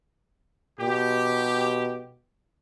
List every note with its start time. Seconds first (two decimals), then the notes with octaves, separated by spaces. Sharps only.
0.80 B2 G4